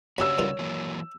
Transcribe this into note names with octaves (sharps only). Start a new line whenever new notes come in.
C#3 D4 F#4 G4 C#5 B5 E6
G2 D#3 F4
E3 F#3 A#3